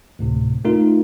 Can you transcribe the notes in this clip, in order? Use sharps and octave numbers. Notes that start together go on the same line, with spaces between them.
D2 A2 C3
A3 D#4 F4 A#4